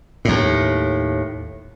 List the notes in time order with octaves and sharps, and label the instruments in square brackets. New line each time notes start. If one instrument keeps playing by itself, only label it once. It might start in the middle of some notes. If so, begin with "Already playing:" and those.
[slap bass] D#2 A2